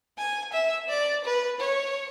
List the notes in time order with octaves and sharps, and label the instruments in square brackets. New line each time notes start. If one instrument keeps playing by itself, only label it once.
[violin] G#5
E5
D5
B4
C#5